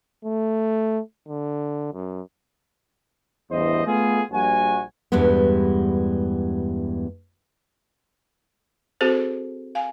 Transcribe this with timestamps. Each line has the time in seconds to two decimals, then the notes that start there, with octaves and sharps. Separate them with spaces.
0.25 A3
1.28 D3
1.93 F#2
3.51 A1 E2 G2 E4 C5 D#5
3.86 A3 B3 F4 G#4
4.31 A#1 G3 F#4 G#5
5.12 E2 G2 G3 G#3 B3
9.01 C4 F#4 G#4 A4 C5
9.75 F5 G#5